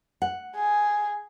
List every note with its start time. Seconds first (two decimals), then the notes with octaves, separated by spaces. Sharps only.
0.22 F#5
0.56 G#4